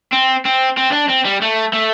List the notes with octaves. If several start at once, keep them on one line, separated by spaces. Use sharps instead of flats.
C4
C4
C4
D4
C4
G3
A3
A3